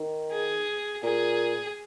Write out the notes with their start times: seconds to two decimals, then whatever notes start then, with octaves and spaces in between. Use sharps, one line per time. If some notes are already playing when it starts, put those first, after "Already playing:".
Already playing: D#3
0.32 G#4
1.03 A#2 G#4